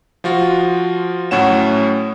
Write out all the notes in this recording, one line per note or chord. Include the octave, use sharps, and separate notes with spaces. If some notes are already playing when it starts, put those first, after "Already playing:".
F3 F4 F#4
A2 F#3 A3 C#4 F#5 E7